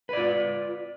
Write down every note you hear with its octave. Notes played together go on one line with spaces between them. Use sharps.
F4 B4 D5